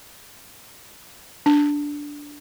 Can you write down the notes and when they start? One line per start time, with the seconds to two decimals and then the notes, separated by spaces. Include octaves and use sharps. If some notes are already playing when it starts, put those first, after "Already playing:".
1.46 D4